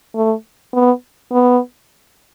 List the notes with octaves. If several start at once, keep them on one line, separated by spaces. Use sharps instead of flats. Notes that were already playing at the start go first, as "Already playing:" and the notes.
A3
B3
B3